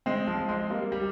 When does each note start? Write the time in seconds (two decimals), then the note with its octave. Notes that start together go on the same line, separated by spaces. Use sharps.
0.06 G#3 C4
0.27 F3 G#3
0.48 G#3 C4
0.70 G3 A#3
0.92 G3